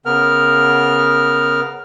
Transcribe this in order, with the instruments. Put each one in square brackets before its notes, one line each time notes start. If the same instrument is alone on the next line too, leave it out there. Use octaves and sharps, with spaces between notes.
[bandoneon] C#3 B3 A#4 F6